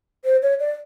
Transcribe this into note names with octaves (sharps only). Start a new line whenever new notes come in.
C5
C#5
D5